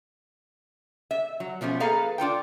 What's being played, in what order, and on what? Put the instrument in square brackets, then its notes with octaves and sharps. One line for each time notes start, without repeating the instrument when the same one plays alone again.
[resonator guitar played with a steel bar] E5
F#3
B2 F3 A3 C#4
A#3 G#4 A4 B4 F5 A#5
D4 F4 A4 G5